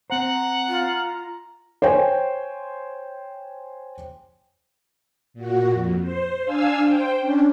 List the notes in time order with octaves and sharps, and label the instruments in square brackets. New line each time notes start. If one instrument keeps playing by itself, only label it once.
[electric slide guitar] C4 C5 [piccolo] F#5 [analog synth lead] A#5
[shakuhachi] F4
[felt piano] C5 C#5 G5 G#5
[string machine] A#2 F#4
F2
C5
D4 F5 G#5 E6
C5 G5
C#4 D4